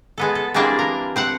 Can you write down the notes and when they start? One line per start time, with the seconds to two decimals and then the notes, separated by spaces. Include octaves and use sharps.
0.18 G#3 B3 A4
0.35 A4
0.54 E3 G3 G#3 A#3 C4 D4
0.79 A#4
1.16 C4 C5 F#5